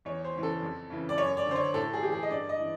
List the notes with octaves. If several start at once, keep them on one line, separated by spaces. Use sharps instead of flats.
E2 C#5
C5
C#3 E3
A4
F2
C#3 E3
D5
F#2 C#5
D5
D3 C5
C#5
A2 A4
G#4
E3 G4
G#4
D#5
G2 D5
D#5
E3